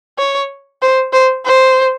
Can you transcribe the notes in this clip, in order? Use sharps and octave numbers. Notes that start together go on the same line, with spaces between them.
C#5
C5
C5
C5